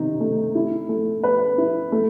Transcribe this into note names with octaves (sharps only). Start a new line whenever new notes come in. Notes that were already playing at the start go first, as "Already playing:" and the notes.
Already playing: C3 D#3 D#4
A3
E4
A3
B4
E4
A3